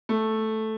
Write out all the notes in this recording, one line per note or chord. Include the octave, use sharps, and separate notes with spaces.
A3